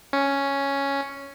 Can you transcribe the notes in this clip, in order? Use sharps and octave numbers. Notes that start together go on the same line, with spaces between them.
C#4